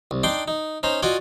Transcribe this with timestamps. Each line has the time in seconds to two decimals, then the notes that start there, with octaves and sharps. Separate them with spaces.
0.11 C2
0.23 D4 D#4 G5 C6 D6
0.48 D#4
0.83 C#4 D#4 C5 A#5
1.03 F4 F#4 D5 D#5 G#5